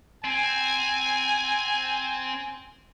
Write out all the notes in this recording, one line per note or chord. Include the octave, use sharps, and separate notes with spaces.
C4 G#5